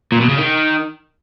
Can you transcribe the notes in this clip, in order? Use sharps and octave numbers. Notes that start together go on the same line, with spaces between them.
A#2
B2
C#3
D#3